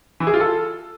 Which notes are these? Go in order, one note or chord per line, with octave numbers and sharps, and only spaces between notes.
E3
G#4
F4
A4